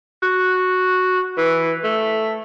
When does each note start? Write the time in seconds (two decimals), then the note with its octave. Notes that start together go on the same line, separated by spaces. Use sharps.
0.23 F#4
1.38 E3
1.84 A3